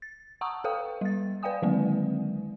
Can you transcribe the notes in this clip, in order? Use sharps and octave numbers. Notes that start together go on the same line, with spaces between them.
A6
F#5 A5 A#5 C#6 D#6 E6
A4 B4 F5 G5 D#6
G3 A6
B4 D5 F5 G5 G#5 D#6
D3 D#3 F#3 G#3 A#3 C4